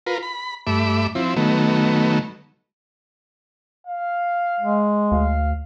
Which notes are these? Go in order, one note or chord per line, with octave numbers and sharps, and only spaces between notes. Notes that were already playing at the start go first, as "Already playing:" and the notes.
F4 A#4 B4
B5
G2 A3 E5 B5 D6
F3 C4 E4
D#3 F#3 A3 B3
F5
G#3
D2 F5